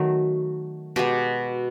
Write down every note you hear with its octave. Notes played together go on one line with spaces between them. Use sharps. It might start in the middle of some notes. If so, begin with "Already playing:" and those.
Already playing: D#3 F#3 A3 F#4
B2 G#3 B3 G4